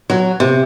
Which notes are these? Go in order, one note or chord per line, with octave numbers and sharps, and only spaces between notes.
F#3
C3